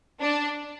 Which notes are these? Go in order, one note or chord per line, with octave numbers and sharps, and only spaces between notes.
D4